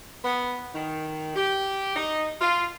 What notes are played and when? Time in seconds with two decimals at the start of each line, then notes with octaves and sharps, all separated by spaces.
0.24 B3
0.75 D#3
1.36 G4
1.96 D#4
2.41 F4